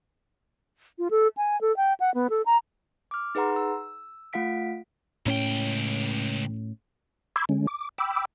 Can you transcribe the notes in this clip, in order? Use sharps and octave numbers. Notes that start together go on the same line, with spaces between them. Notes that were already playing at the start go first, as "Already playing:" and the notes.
F4
A4
G#5
A4
G5
F#5
B3
A4
A#5
D6 F6
D#4 G#4 B4 F#5 A#5 C6
E6
A3 F4 F5 F#5 B6 D7
C#2 A2 C#4 G5
B5 C6 D6 E6 G#6
D3 G#3 C#4
D6
G5 B5 D6 E6